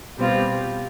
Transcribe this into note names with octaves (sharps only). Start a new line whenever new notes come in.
B2 G3 C4 F4